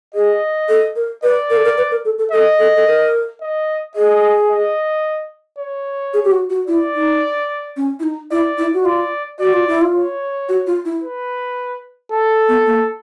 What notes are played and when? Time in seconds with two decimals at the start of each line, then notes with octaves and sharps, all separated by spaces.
0.14 G#4 D#5
0.69 A4
0.96 A#4
1.23 B4 D5
1.50 A#4
1.57 A4
1.64 A#4
1.78 B4
1.91 A#4
2.05 A4
2.18 A4
2.31 A4 D#5
2.59 A4
2.76 A4
2.87 A#4
3.41 D#5
3.95 G#4 D#5
4.50 D#5
5.58 C#5
6.13 G#4
6.24 G4
6.31 F#4
6.50 F#4
6.67 E4 D5
6.95 D#4
7.77 C#4
8.00 E4
8.03 D#4
8.31 E4 D5
8.58 E4
8.74 F#4
8.85 F4 D5
9.39 F#4 D5
9.53 F4
9.68 E4
9.81 F4
9.95 C#5
10.49 F#4
10.67 F4
10.85 E4
11.04 B4
12.12 A4
12.48 B3
12.66 A#3